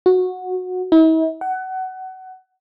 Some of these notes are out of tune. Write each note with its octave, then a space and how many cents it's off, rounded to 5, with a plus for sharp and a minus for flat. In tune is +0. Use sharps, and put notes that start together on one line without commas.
F#4 -15
E4 -45
F#5 +25